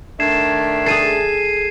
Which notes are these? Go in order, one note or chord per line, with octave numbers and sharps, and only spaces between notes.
D#3 A3 D4 G#6 C7 E7
G#4 A4 C7 D#7